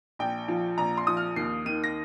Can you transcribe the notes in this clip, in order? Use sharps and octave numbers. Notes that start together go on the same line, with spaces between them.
A#1 G5
F3
A#1 A#5
C6
F3 D#6
F6
D#2 C7
D#3 D#7
A#6